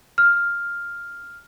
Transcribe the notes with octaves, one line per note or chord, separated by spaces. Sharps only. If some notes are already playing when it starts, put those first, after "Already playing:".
F6